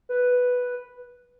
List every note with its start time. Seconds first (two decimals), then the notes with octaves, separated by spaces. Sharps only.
0.09 B4